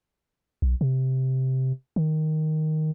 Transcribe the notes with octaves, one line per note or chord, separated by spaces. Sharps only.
B1
C3
D#3